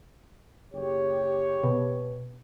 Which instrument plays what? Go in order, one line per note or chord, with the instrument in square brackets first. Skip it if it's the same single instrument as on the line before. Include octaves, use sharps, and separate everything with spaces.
[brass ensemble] F#1 G4 C#5
[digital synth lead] B2